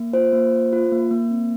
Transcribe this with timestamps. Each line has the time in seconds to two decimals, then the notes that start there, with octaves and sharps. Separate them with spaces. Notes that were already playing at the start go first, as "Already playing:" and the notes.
Already playing: A#3
0.13 F4 C5
0.33 A#3
0.53 F4
0.73 F4
0.92 A#3
1.11 A#3
1.31 C4